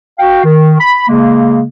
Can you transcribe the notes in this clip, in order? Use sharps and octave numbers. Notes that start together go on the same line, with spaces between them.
F#4 F5 G5
D#3
B5
C#3 G#3 A#3